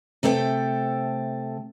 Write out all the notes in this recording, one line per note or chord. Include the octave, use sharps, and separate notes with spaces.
C3 A3 A4 C#5 G5